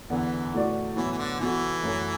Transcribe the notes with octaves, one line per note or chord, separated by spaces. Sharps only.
E2 D3 E3 B3
A2 A3 F#4 D5
A2 E3 F#3 B3 E4
E3
D3
B2 E3 B3 F#4 A4
F#2 F#3 A3